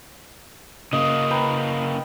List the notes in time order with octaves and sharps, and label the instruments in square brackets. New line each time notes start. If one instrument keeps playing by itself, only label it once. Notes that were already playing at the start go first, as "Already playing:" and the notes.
[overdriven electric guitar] C#3 A#3 [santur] D#5
[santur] B4 G5 A#5